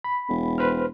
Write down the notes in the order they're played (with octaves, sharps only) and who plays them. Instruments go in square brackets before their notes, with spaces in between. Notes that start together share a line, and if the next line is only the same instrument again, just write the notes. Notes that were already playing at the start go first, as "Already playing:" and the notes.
[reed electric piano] B5
[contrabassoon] E1
[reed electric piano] B4 C5 F6